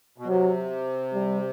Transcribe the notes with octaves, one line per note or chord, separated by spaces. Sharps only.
B2
C3 F#3
G3